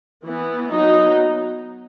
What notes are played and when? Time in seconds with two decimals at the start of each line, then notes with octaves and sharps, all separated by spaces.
0.24 E3 B3
0.70 F#3 B3 D#4